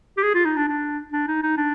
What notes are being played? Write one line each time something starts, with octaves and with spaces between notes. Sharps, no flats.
G4
G#4
F4
D#4
D4
D4
D4
D#4
D#4
D4